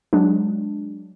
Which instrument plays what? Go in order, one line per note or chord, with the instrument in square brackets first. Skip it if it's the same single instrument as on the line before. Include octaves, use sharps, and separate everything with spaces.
[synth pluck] F#3 G#3 D4